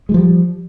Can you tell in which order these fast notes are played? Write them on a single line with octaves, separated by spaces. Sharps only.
G#3 E3 F3 G3